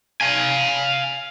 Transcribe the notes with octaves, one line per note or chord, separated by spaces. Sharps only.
F5 G#5